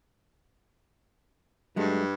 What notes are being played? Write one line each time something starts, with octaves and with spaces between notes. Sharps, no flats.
G2 F#3 G#3 A3